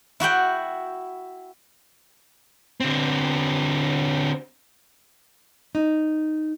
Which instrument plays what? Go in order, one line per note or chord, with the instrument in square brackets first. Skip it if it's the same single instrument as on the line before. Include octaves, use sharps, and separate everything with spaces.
[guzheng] E4 F#4 F#5 G5
[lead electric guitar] D3 C4
[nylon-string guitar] D#4